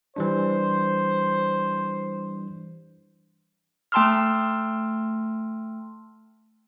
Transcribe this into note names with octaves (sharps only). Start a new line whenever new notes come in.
E3 G3 D4 C5
A3 G5 A5 C6 E6 F6